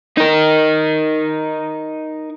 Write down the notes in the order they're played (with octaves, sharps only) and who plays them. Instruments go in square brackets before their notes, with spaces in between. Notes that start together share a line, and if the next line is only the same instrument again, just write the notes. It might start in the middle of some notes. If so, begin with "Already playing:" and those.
[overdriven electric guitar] D#4 A#4